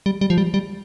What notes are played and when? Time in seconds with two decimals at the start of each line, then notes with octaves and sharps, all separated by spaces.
0.06 G3
0.21 G3
0.30 F3
0.38 G3
0.54 G3